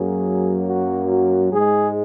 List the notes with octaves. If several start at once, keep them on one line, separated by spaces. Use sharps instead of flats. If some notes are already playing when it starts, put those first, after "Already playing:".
Already playing: F#2 F#3 A#3 G#4
F#4
F#4
G#2 G#3 G#4